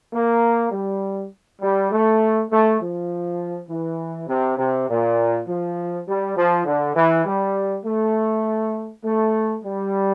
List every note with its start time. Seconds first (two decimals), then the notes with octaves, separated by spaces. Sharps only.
0.12 A#3
0.71 G3
1.60 G3
1.90 A3
2.50 A3
2.79 F3
3.68 E3
4.28 C3
4.58 C3
4.87 A#2
5.46 F3
6.06 G3
6.35 F3
6.65 D3
6.95 E3
7.24 G3
7.84 A3
9.03 A3
9.62 G3